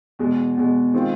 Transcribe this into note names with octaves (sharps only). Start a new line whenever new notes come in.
E2 B2 G#3
E2 B2 G#3
D#3 G#3 C4 F4